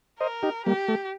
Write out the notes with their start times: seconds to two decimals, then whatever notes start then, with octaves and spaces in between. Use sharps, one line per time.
0.20 A#4 C5 D#5
0.43 D#4 G4
0.66 G3 A#3 G4
0.88 A3